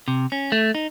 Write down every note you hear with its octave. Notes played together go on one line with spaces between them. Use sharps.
C3
C#4
A3
D#4